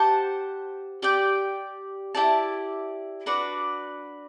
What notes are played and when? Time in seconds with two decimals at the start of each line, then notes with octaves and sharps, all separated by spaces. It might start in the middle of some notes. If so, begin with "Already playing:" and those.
Already playing: G4 C5 F#5 A5
1.02 G4 D5 G5
2.15 E4 G4 D5 A5
3.26 D4 F#4 B4 D5